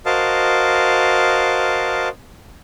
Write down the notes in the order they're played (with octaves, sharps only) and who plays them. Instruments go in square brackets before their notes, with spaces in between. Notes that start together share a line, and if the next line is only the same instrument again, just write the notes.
[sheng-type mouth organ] F#4 A#4 C5 D#5 F5 A5